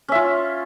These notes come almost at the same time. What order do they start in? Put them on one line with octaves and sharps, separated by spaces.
C#4 E5 F4